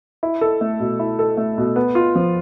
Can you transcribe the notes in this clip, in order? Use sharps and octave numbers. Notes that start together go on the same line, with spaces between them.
E4
A4
A3
B2
E4
A4
A3
B2
B3
F4
F3